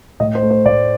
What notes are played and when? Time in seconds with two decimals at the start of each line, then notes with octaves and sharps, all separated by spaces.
0.20 A2 D#5
0.35 C5
0.42 A3
0.51 C5
0.66 A2 D5